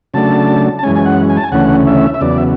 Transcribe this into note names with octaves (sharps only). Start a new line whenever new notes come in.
C#3 F#3 A3 D4 A5
A5
F#2 E3 G#3 C#4 G#5
G#5
F#5
G#5
A5
G#5
D2 C#3 E3 A3 C#4 F#5
E5
E5
E2 C#3 F#3 B3 D5
E5